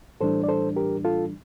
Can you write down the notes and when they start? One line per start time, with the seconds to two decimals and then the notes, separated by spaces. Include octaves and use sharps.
0.21 A2 E3 G3 D4 A4 C5
0.44 D5
0.48 A4 C5
0.76 G4 A#4
1.05 F4 A4